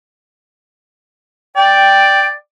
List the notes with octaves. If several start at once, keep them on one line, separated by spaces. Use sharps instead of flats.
D5 G5